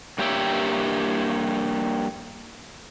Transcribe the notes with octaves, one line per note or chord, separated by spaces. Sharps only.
G2 A#3 G4 C#5 E5 G5